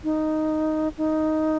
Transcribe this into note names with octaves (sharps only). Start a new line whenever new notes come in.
D#4
D#4